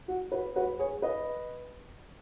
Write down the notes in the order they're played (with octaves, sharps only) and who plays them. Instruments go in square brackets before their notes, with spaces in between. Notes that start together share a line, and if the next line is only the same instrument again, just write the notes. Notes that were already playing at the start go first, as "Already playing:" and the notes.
[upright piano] F#4
F#4 B4
F#4 B4
G#4 C#5
B4 D#5